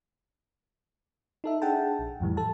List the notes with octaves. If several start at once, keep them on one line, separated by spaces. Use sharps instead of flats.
D#4 A4 E5
D4 G#4 F#5 G5 A5
A#1
F2 A2 E3 G3
A4 A5